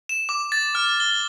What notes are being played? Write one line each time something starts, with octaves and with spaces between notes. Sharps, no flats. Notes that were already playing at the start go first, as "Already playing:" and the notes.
E7
D6
A6
F6
G7